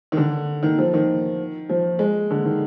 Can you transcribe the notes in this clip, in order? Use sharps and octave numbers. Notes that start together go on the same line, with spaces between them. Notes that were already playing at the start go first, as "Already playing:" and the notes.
D#3
D3
D#3
F3
D#3
F3
G#3
D3
D#3